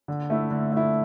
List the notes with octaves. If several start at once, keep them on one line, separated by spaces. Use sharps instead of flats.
D3
A3 E4
D3
A3 E4